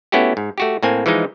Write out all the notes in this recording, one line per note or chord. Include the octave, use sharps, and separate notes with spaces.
A3 B3 C#4 E4 F#4 G4
G#2
A3 F#4 G4
A2 A#3 C4 G#5
E3 F3 G#3 D#4